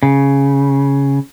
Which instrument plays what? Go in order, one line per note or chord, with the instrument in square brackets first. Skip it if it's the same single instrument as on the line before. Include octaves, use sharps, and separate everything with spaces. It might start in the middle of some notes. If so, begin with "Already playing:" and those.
[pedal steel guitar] C#3